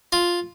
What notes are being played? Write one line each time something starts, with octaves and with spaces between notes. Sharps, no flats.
F4